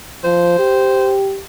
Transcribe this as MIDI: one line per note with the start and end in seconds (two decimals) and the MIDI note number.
0.24 0.56 53
0.24 1.13 72
0.59 1.40 67